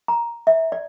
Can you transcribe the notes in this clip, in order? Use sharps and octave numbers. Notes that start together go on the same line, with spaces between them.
A#5
E5
D5